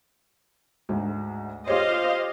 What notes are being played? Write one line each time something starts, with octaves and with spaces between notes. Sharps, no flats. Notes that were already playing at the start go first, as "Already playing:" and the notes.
D2 G#2
F4 G4 C5 C#5 D#5 F5